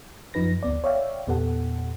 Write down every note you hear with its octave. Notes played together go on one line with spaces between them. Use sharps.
F#2 F3 D#4 B4 A#6
D2 B3 D5
C#5 D5 E5 F5 G5
E2 A#2 B3 G4 A4 F#5